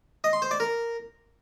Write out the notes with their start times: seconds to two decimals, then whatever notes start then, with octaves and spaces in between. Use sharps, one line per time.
0.24 D#5
0.33 C6
0.42 C5
0.51 D5
0.60 A#4